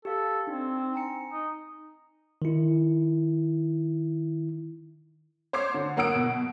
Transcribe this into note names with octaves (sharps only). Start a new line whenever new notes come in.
G4 A4 F5
C4 D4 D#4
G#5 A#5 C#7
D#4
D#3 E4
C5 C#5 D6 C7
D3
F#3 A#3 F#5 D#6 E6 D7
B2